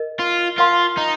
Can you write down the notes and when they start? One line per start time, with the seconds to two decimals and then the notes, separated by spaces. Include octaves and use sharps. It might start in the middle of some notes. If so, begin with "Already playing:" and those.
Already playing: A#4 D#5
0.20 F4
0.58 F4 A#4 F5 A5 C6
0.97 D#4